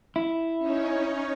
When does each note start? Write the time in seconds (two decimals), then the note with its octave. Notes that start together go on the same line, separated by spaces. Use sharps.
0.16 E4
0.58 C#4 D#4 C#5